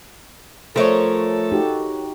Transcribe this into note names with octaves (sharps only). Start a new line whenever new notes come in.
F3 A3 A4 A#4 C#5
D#4 F#4 G4